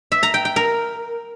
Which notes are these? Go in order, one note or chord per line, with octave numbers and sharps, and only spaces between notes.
E5
A#5
G5
G5
A#4